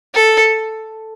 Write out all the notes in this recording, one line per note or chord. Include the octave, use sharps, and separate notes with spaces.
A4